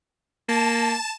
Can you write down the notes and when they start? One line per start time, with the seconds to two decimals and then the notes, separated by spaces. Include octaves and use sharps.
0.49 A#3 A5 E7